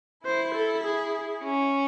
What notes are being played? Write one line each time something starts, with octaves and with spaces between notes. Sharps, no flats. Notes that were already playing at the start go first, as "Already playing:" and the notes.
E4 C5
A4
G#4
C#4